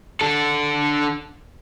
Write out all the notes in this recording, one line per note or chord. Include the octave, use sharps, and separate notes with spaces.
D3 A4